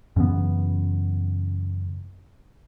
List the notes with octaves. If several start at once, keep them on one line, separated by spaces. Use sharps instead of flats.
F#2 C#3 E3 B3